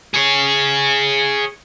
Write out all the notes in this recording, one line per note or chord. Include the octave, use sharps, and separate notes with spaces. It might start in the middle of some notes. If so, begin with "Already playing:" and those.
G#4 C#5